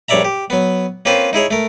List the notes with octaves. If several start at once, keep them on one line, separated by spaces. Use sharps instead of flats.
A#1 G2 C#5 D5 E5 A#5
G4
F#3 B3
A#3 C4 C#4 F4 B4 C5
D#4 E4 G#4 C#5
A3 A#4